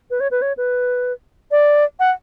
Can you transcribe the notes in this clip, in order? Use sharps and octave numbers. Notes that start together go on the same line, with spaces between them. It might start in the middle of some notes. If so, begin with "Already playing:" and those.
B4
C#5
B4
C#5
B4
D5
F#5